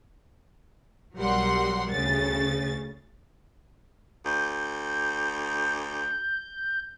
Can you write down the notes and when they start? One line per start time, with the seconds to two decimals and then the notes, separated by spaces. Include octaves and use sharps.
1.16 B1 F#3 G3 A#4 F#5 C6
1.91 D2 C#3 A6
4.26 D2 G6